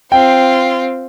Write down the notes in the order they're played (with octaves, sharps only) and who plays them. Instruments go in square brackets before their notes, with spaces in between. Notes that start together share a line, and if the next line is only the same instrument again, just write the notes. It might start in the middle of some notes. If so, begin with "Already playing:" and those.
[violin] C4 F4 [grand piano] G5